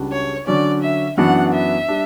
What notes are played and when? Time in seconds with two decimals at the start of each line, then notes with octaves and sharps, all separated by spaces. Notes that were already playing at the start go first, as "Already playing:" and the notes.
Already playing: C#2 C#3 G3 D4 F#4
0.12 C#5
0.47 D3 F#3 C#4 D5
0.83 E5
1.17 F#2 E3 B3 D4 F#4 F#5
1.54 E5
1.88 G3 D4